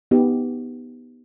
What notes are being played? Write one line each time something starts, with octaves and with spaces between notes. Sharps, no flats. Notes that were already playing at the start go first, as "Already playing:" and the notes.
B3 D#4 G4